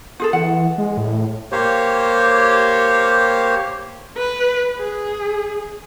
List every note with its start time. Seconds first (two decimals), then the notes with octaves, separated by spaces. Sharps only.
0.20 F4 G#4 A4
0.33 E3 F#5
0.78 G#3
0.97 A2
1.52 A#3 G4 C5 C#5
4.17 B4
4.78 G#4